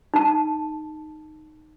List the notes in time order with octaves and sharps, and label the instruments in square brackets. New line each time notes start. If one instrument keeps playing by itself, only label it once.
[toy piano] D#4 A5